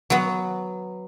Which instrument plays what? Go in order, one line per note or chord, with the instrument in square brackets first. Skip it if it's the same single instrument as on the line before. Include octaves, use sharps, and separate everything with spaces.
[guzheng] F#3 B3